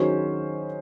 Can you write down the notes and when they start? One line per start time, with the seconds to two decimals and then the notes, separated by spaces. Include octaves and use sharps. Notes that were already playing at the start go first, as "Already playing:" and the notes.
Already playing: D#3 F#3 C#4 G#4 C5